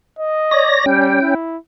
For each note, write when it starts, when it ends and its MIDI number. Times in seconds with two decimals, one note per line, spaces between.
0.19 0.75 75
0.51 0.86 73
0.51 0.86 74
0.51 0.86 94
0.86 1.21 55
0.86 1.35 61
0.86 1.35 79
1.22 1.57 64